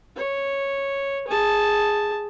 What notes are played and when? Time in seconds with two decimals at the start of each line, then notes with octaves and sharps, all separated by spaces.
0.16 C#5
1.28 G#4 A5